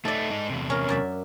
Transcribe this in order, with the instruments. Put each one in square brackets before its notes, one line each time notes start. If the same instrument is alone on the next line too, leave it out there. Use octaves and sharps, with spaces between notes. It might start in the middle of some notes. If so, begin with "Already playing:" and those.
[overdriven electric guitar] A3 D#4 [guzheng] A4 D5
[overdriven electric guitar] G#2 D#4
E2 C3
[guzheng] C#4 A#4
F#2 D5 E5